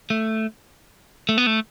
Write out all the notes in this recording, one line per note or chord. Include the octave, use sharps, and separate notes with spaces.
A3
A3
B3
A3